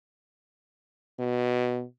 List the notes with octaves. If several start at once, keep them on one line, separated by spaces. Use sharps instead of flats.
B2